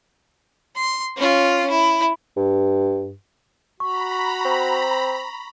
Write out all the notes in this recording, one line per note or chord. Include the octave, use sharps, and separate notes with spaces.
C6
C#4 F4
E4
G2
F#4 A#5 B5 C#6
C4